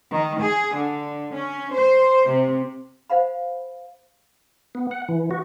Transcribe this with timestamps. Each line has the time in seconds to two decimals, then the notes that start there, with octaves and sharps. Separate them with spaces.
0.10 D#3
0.41 G#4
0.75 D3
1.34 C#4
1.73 C5
2.28 C3
3.10 C5 F5 F#5 B5
4.75 B3
4.91 F#5
5.09 E3
5.31 F#4